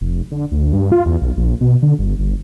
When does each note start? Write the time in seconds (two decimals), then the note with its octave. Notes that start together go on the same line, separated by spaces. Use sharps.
0.01 F1
0.31 D3
0.52 D2
0.73 G2
0.92 F4
1.06 E2
1.21 B1
1.37 A#1
1.61 B2
1.82 D3
1.99 G1
2.19 G1